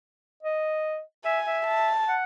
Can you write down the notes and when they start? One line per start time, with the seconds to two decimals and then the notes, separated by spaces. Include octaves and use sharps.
0.43 D#5
1.25 E5 G#5
1.47 E5
1.67 A5
2.08 F#5